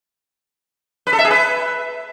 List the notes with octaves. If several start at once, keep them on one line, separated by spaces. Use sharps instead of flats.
B4
A4
E5
G#4
B4